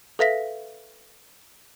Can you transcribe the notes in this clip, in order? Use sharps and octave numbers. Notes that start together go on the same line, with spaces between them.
A4 B4 E5 F5 A#6 B6